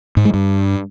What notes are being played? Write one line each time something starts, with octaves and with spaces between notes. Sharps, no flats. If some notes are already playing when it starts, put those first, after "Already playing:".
G#2
G#3
G2